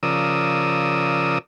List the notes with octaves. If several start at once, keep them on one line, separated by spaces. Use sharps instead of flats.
C#3 F3 A#4 D5 D#6 E6